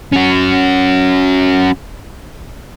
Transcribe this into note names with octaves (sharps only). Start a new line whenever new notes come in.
C#4 F#4